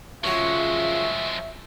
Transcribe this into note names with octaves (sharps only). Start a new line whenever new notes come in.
F#2 C#3 F3 G#3 F4 F#4 C#5 E5